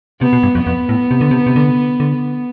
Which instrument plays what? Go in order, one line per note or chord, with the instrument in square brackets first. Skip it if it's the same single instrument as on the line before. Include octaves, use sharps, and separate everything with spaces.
[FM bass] C3 [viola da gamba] B3
[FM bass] B2
G2
F2
[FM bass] F2 [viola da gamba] B3
[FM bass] A2
C3
D3
C3
C3
D3
D3